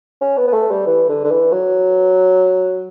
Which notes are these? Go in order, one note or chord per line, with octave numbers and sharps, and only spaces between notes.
C#4
B3
B3
A3
G3
E3
D3
D3
E3
F#3